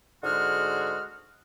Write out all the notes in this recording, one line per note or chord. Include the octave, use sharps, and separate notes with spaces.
G#2 D3 G#3 F#4 G#4 F6